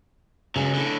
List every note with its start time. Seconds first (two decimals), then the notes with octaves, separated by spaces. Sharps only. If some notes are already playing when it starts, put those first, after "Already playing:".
0.56 C#2 C#3 F#3
0.74 A2 D3